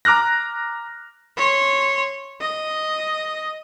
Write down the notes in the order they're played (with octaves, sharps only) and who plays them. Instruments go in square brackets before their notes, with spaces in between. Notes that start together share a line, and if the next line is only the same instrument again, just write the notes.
[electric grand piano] A#5 D6 F6 F#6 A#6
[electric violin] C#5 C6
D#5